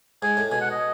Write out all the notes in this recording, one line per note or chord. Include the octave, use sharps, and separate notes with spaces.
G#2 G#5
A2
B2 G#5
F#5
D#5